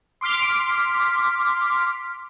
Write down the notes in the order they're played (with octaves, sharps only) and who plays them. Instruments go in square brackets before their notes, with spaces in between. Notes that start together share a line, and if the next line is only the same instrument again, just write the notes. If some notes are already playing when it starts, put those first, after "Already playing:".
[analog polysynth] C6 D6 F6 B6